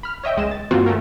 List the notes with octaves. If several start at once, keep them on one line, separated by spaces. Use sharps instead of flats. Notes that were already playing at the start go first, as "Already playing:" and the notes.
B5 F6
C#5 D#5 E5 G5
C#2 G#3 D#5 E7
A6
G2 D#3 A#3 C4 F4 F#4
A3 C#4 A#4